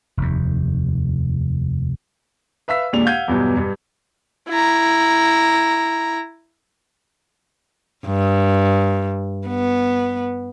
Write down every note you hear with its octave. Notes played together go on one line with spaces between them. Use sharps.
F1 D#2
B4 E5 F5 E6 B6
D#2 A#2 G#3 D4 F7
F5 F#5 G6 G#6 D#7
E2 G2 B2 F#3
G2
E4 A#5
G2
B3